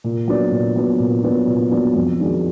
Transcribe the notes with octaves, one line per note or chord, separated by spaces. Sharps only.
A#2
F#3 B3 D4
A#2
F#3 B3 D4
A#2
F#3 B3 D4
A#2
F#3 B3 D4
F2
D#3 G#3 D4 F#4